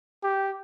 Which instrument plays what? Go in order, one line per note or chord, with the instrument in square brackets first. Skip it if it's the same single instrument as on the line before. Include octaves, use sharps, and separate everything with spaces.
[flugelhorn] G4